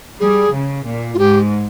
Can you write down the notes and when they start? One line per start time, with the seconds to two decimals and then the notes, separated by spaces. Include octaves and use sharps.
0.20 G3 G#4
0.53 C#3
0.86 A#2
1.14 F4
1.19 G#2 G4